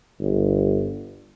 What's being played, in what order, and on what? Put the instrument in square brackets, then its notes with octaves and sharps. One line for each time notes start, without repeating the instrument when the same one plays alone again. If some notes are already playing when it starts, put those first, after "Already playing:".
[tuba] G1